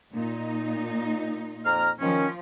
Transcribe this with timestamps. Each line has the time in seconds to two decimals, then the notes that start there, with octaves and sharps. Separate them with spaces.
0.14 A#2 D#4
1.65 F2 A#5 F6
2.01 D#3 F3 C#4